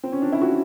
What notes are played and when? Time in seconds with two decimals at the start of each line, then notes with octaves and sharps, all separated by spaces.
0.04 C4
0.12 C#4
0.22 D4
0.32 E4
0.42 F#4